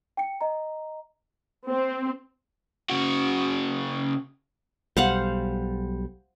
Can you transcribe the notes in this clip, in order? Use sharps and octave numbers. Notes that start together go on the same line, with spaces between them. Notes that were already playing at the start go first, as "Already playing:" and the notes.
G5 C#7
D#5 A#5
C4
C#3 F#4
B1 G3 C5 F5 F#5